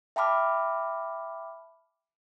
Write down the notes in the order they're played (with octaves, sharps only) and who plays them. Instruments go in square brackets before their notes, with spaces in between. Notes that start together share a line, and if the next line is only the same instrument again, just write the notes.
[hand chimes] E5 G5 A5 B5 D6 F6